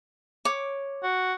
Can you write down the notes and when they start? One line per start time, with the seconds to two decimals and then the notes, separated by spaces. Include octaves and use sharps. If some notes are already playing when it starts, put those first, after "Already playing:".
0.45 C#5 D6
1.03 F#4